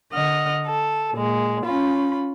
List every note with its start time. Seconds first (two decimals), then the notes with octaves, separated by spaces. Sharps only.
0.11 D3 D#5 F#5 F6
0.66 A4
1.13 A#2 G#3
1.65 C#4 F4 B5